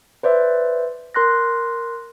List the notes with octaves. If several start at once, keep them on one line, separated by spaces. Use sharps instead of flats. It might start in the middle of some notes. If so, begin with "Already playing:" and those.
B4 C5 D5 E5
A#4 C6 F#6 A#6